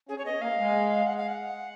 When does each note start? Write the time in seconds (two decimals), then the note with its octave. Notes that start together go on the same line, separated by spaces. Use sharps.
0.09 C#4 G#4
0.18 C#5
0.25 B3 D#5
0.42 A#3 F5
0.58 G#3
1.06 F#5
1.17 F5
1.28 F#5